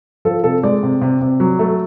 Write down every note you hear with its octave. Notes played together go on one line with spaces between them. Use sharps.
F3 A4
C3 A4
G#3 D5
C3
C3
C3
F#3
A3